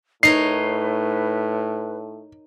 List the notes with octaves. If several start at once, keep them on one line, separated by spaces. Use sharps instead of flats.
A2 D#4 A#4 B4 C#5 C7